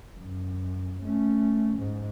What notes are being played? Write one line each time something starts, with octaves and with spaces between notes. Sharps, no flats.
F#2
A3 C#4
G#2